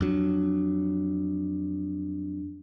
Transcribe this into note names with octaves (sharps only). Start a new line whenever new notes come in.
F2 F#3 D4